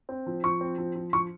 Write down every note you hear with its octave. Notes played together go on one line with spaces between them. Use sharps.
C4
F3
F3 C#6
C4
F3
F3
F3 C#6